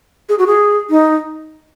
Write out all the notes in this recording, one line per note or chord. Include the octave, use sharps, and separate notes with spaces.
G#4
F#4
G#4
D#4